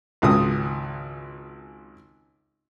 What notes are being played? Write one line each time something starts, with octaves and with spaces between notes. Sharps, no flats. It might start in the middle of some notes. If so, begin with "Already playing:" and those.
G#1 C#2 C#3 D#6